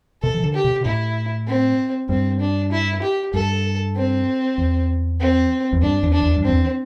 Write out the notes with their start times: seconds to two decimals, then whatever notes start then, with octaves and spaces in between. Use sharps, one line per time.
0.22 C3 A4
0.34 E3
0.43 D3
0.54 G4
0.64 C3
0.85 A2 E4
1.47 C4
2.09 G2 C4
2.40 D4
2.72 E4
3.02 G4
3.33 G2 A4
3.96 C4
4.58 E2
5.20 C4
5.73 E2
5.82 G2 D4
6.03 E2
6.13 D4
6.23 E2
6.36 G2
6.45 E2 C4